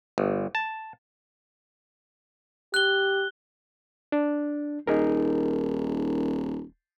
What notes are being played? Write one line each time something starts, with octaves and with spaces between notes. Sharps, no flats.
G1
A5
G4 F#6 G7
D4
D#1 D#4 G#4 A#4